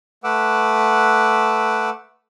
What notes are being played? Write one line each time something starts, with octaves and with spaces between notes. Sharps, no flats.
A3 B4 F#5 D6 E6